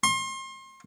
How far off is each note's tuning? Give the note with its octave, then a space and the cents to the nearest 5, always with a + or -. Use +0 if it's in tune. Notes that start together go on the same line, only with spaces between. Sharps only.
C6 +35